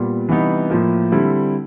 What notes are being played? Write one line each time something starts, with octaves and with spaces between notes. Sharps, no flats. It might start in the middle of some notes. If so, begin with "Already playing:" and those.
Already playing: A#2 G3 B3
C3 E3 G3 B3 D#4
A2 F3 A#3
D3 G3 C4 E4